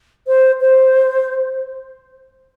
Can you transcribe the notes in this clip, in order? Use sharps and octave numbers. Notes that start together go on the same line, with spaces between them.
C5
C5